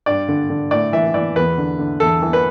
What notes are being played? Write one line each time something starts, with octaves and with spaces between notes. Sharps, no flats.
G2 D5
D3
D3
A2 D5
E3 E5
E3 D5
E2 B4
D3
D3
E2 A4
E3
B4